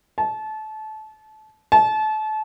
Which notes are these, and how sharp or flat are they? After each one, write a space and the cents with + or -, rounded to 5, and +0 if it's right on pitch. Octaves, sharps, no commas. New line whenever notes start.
A5 -25
A5 -30